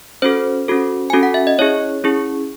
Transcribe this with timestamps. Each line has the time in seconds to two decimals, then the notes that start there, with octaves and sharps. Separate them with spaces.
0.22 C#4 F#4 A4 C5
0.68 C#4 F#4 A4
1.10 C#4 F#4 A4 G#5
1.23 F#5
1.34 E5
1.47 D#5
1.59 C#4 E4 G#4 C#5
2.04 C#4 E4 G#4